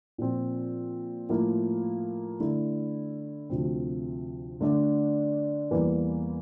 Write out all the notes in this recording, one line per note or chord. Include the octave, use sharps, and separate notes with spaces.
A#2 F3 C4
A2 F3 A#3 E4 A#4
D3 A3 E4
D2 C3 F3 C4
D3 A3 D4 A4 D5
E2 E3 G3 A#3